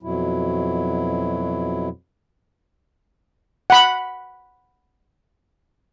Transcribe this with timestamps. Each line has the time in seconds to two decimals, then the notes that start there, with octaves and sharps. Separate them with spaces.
0.03 F2 B2 F#3 E4
3.70 F#5 B5